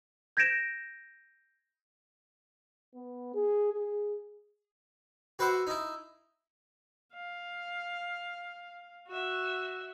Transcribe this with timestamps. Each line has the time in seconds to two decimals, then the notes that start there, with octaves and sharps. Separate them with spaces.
0.37 G6 G#6 A#6 B6 D7 E7
2.95 B3
3.34 G#4
3.73 G#4
5.39 F#4 B4 C5 E5 F#5
5.67 D#4 E4
7.13 F5
9.08 F#4 E5